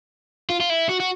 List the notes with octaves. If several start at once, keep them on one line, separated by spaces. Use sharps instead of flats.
F4
F4
E4
F#4
F#4